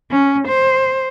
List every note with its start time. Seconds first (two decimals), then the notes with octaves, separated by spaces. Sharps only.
0.11 C#4
0.48 C5